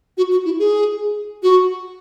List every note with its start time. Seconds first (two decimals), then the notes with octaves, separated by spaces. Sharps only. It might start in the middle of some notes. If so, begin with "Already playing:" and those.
0.17 F#4
0.31 F#4
0.45 E4
0.59 G#4
1.43 F#4